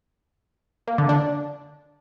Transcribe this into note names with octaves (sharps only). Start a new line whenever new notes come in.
A#3
D3
D4